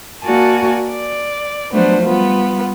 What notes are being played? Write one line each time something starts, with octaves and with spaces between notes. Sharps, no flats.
A#3 F#4 D5 G#5 A5
D5
F3 F#3 A3 B3 D4 C5
G3 B3 F4